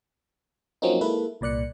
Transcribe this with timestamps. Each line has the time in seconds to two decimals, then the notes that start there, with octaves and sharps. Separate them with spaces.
0.82 F3 F#3 A#3 C4 C#4 D#4
1.01 G#3 A#3 E4 A4 B4
1.41 C2 A#2 D5 F#6 C#7